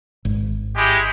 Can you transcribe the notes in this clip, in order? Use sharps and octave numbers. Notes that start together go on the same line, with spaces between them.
G#1
G#3 E4 G4